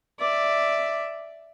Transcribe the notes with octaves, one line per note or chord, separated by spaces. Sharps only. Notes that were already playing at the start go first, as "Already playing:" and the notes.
D5 E5